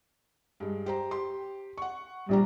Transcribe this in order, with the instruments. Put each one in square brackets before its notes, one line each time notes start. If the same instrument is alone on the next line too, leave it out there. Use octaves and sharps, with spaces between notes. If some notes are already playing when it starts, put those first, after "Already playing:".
[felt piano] G2 G#3
G4 C5 A#5
G4 C6
F#5 C#6
[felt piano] A#1 D4 A#5 [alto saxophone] G3